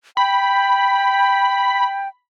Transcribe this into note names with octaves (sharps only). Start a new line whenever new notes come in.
G5 B5